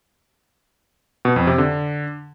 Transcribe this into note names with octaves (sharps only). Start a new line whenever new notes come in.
B2
F2
C3
D3